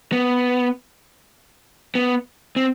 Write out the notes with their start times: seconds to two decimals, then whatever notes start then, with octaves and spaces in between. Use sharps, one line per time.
0.12 B3
1.95 B3
2.56 C4